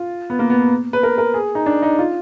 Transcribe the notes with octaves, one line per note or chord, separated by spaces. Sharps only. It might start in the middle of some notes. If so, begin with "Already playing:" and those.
Already playing: F4
B3
A#3
B3
B4
A#4
A#4
G#4
D#4
D4
D#4
F4